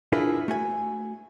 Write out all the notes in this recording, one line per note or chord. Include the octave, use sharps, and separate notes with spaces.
D4 E4 F4 G#4 A#4 B4
A3 F#4 G#5